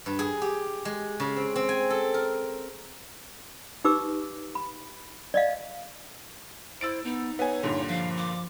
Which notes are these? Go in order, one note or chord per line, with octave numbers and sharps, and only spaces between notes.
G2
G#4
G4
G#3
C#3
C4
C4
G#5
A4
A#4
D#4 G4 B4 D6 E6
B5
D5 D#5 F5
E4 C5 E6 A6 D7
B3 D#4
B3 C#5 G#5
G2 A#2 D3
F3 F5
D6